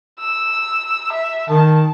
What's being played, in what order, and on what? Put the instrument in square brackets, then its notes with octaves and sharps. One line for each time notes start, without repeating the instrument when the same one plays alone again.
[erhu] E6
E5
[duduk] D#3 [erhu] A5